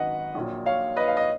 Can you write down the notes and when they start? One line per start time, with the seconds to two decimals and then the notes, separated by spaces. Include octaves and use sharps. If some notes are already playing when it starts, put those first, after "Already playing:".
Already playing: G#1 F#2 D#3 F#3 B4 D#5 F#5
0.35 A#1 A#2 F#3
0.66 C#5 F5
0.96 B4 D#5
1.08 F5
1.17 D#5